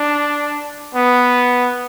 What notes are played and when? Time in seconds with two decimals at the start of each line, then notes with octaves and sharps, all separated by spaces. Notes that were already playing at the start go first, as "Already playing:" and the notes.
Already playing: D4
0.95 B3